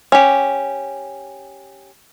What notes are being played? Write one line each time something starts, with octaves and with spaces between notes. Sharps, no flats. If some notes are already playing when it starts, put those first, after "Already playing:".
C#4 G4